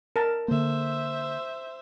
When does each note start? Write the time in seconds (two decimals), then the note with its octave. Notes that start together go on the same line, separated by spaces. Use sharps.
0.16 A#4 A5
0.48 D3 A#3 C5 E5